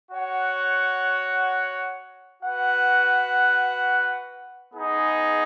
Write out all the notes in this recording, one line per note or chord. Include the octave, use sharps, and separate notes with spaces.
F#4 C#5 F#5
F#4 B4 F#5
B3 D#4 G#4